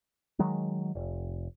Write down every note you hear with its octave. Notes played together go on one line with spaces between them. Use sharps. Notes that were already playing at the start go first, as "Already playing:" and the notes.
D#3 F#3 G#3
F1